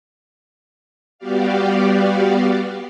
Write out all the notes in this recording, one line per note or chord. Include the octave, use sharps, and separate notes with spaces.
G3 B3 F#4 G4 D5 F5